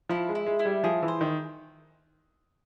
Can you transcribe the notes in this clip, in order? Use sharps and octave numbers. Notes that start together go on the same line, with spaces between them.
F3 E4
G#3
E4
G#3
E4
G3
F3 G#4
E3
C5
D#3